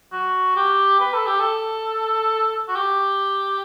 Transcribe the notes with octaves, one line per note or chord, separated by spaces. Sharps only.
F#4
G4
B4
A4
G4
A4
F#4
G4